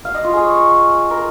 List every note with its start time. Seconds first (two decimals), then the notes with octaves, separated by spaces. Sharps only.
0.05 F5
0.15 D#5
0.24 F4
0.33 G#4
0.44 C#5
1.11 A#4